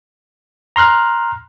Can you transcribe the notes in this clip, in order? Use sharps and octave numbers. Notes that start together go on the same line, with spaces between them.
A#5 C6 F6 F#6